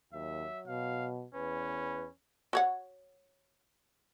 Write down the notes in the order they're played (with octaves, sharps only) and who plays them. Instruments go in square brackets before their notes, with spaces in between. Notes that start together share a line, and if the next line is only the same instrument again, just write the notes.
[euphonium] D#2 [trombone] F#3 [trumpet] E5
[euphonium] B2 [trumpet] F5
[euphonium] E2 [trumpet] C#4 [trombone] B4
[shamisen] F#4 C#5 F#5